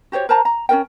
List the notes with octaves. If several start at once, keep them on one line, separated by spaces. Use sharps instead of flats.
F#4 G4 C5 C#5
A#4 C5 A5 A#5
A#5
C#4 F4 A#4 G5